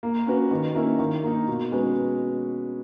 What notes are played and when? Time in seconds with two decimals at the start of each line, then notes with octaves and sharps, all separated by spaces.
0.03 A#3
0.27 C#4 F#4 B4
0.51 D#3
0.75 A#3 C#4 E4 A#4
0.99 D#3
1.23 A#3 D#4
1.48 B2
1.72 G#3 C#4 F#4 B4